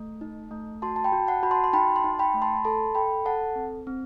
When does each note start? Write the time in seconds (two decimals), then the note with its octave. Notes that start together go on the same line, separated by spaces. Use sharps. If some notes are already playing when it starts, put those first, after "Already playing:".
Already playing: A3
0.21 D#4
0.51 A3
0.82 F#4 A5 C6
0.96 A5
1.04 G5 B5
1.12 F#4
1.27 F#5 A5
1.43 F#4 B5
1.51 A5 C6
1.64 C6
1.73 D#4 G5 B5
1.96 A5 C6
2.04 D#4
2.19 G5 B5
2.34 A3
2.42 A5 C6
2.56 B5
2.65 A4 A5 C6
2.95 A4 G5 B5
3.25 A4 F#5 A5
3.56 C4
3.87 C4